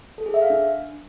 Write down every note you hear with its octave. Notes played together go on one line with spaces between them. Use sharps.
A4
G#4
E5
F5
D4